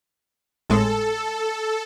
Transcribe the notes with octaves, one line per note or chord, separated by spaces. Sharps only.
G#1 A2 G#3 A4